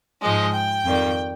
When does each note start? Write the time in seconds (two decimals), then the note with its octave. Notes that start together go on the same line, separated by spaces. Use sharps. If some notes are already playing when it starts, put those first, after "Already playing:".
0.22 G#2 F3 G#3 D#5
0.53 G5
0.85 F2 D#3 G3